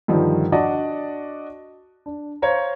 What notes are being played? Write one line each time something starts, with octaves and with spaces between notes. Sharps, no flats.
G2 D3 D#3 F3
D4 F#4 D5 D#5 F#5 A5
D4
C5 C#5 F5 A#5